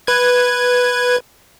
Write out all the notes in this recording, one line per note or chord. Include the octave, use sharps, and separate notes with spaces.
B4 G#6